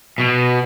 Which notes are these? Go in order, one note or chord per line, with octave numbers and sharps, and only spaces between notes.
B2